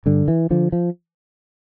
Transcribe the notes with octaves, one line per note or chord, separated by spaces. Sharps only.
G2 D3
E3
D3 F3
F3